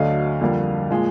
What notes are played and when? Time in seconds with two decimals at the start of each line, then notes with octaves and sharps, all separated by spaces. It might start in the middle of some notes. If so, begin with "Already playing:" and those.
Already playing: D2 D3 F#3 A3 D#5 F5
0.41 F2 D3 G3 A#3
0.91 A#2 F3 G#3